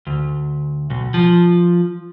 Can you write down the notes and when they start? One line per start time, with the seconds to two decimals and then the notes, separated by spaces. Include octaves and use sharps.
0.07 D2
0.90 B1
1.14 F3